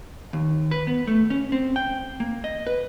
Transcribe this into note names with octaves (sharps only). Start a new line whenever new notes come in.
D#2
B4
B3
A3
C#4
C4
G5
A#3
D#5
B4